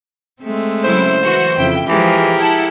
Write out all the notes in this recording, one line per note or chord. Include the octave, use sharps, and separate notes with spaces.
G#3 A3 C4
C#3 F#3 E4 C5
E3 F#4
F2 C#3 E4 G5
E3 F3 G#3 G4 G#4 A#4
E4 A4 F#5